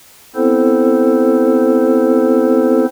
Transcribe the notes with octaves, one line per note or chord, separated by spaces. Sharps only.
B3 C4 E4 A4 C5